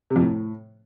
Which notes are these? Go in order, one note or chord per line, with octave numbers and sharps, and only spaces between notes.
C3
F2
A2